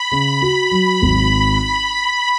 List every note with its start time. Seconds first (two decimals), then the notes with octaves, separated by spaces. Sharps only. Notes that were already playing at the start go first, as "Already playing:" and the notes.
Already playing: B5
0.12 C#3
0.42 F#4
0.71 F#3
1.02 G#1